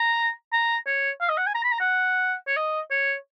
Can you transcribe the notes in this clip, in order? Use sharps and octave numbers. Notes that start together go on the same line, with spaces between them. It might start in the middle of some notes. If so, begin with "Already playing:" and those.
Already playing: A#5
A#5
C#5
F5
D#5
F#5
G#5
A#5
B5
A#5
F#5
C#5
D#5
C#5